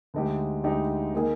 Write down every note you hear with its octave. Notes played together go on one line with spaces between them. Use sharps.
D2 D3 G#3 D#4 G4
D2 D3 G#3 D#4 G4
D#3 A#3 D#4 G#4